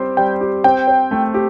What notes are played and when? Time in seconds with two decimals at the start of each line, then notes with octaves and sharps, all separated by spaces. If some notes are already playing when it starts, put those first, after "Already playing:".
Already playing: G3 C4 G4 C5
0.17 G3 G5
0.41 G4
0.64 C4 G5
0.88 C5
1.11 A3
1.34 G4